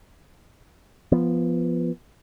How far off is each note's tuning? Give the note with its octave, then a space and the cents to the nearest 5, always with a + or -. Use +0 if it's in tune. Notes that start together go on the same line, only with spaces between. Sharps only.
F3 -20 B3 -5